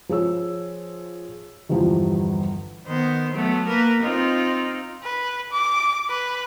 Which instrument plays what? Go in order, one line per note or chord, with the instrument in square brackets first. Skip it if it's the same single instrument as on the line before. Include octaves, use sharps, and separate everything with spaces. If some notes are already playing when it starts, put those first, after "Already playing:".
[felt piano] F3 G#4 C#5 E6
G1 E2 F3 G3
[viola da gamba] D#3 B3 C5
F#3 A3 B3
A#3 A#4 B4
C4 D#4 F4
[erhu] B4
D6
B4